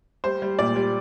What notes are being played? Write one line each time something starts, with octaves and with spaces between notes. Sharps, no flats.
G3 C5
G3
A#2 D5
G3